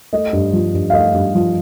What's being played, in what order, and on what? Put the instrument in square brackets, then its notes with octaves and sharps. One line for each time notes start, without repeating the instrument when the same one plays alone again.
[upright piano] A3 D#5
G2
F3
G2
F5
A3 D#5
G2
F3